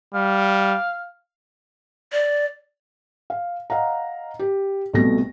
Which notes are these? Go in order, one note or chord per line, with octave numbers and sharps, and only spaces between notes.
G3 F5
D5
F5
D#5 F5 F#5 A#5
G4
C2 B2 A3 A#6